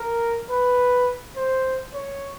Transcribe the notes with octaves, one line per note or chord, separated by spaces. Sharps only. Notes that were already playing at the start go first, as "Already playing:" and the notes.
Already playing: A#4
B4
C5
C#5